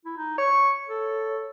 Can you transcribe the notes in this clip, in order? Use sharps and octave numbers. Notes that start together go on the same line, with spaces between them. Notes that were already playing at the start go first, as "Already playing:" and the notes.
E4
D#4
C#5 C#6
A4